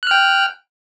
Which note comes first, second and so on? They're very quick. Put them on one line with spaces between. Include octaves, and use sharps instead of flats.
F#6 F6 G5